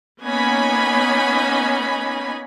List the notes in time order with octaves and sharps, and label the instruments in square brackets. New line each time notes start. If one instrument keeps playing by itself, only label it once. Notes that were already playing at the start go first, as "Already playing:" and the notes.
[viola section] A#3 B3 C#4 D#4 G#5 B5